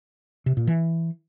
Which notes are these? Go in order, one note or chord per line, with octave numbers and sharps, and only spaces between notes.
C3
A#2
E3